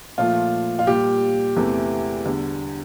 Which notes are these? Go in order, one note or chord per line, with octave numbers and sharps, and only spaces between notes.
A#2 F3 A3 F4
F4
A#2 G3 G4
E2 C3 E3 A3
E2 D3 G3